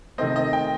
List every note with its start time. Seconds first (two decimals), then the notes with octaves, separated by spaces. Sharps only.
0.18 C3 D#3 A3 C4 D#5
0.36 D#5
0.53 G5